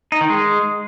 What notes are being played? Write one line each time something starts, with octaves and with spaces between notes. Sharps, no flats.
D#4
D#3
G#3